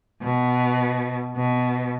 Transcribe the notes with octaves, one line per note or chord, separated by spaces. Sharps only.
B2
B2